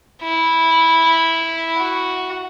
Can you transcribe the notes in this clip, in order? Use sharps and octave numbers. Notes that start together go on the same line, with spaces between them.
E4
F#4